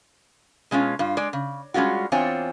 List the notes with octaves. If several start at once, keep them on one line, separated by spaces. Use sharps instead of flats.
B2 G#3 C#4 F4
G2 F4
G#3 D5
C#3
G3 G#3 C#4 F4 F#4
E2 C4 D4 F4 C#5 G#5